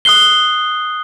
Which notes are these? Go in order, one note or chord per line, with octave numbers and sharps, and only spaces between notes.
D#6 F#6 C7 G7